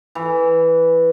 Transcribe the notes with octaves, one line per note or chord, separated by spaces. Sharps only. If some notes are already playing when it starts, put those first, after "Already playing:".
E3